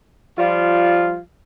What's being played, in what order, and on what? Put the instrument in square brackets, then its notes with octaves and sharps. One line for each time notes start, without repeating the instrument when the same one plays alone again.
[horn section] F3 G3 F4